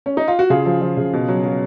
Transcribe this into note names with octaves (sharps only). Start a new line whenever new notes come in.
C#4
D#4
F4
F#4
C#3 F4 G#4
F3
F3
C#3
B2
F#3
F#3